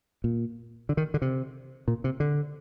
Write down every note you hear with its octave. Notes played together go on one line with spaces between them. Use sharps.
A#2
D3
D#3
D3
C3
A#2
C3
D3